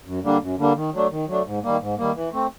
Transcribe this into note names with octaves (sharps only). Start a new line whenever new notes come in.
F#2
D3 G3 A#3 D4
F#2
D3 G3 A#3 D4
D#3
F#3 A3 D4
D#3
F#3 A3 D4
G#2
D#3 G3 A#3
G#2
D#3 G3 A#3
E3
A3 C4